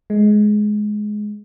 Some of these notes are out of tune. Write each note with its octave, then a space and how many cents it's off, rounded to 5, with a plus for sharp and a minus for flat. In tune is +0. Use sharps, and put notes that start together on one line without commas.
G#3 +15